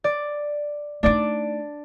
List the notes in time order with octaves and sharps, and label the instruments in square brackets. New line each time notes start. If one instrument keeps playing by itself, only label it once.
[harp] D5
[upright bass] A3 D#4 [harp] D4 D5 D7